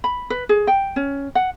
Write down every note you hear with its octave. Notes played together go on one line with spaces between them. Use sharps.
B5
B4
G#4
G5
C#4
F#5